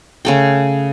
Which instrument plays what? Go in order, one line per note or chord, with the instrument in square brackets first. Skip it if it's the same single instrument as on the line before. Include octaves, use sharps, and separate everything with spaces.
[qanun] C#3 A3 G5